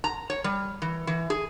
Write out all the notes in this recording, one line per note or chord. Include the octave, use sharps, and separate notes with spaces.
A#5
C#5
G3
E3
E3
G#4